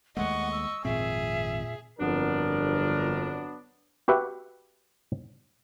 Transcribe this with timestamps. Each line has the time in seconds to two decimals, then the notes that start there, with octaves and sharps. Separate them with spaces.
0.17 D#2 G#3 A3 D#5 F#5 C#6
0.52 E6
0.85 G#1 F2 A#2 C4 G#4 E5
2.00 G1 F2 F#3 B3 D4 A#4
4.08 F#4 G4 B4 E5 F#5